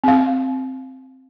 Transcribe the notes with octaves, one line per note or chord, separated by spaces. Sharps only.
C4 F5